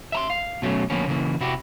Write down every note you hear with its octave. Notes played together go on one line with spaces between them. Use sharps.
E5 A#5 C6
F5
B2 F#3 G3 A3 C#4
D2 F3 A#3 B3 C#4
C#3 E3 A#3
C3 E4 F#4 G4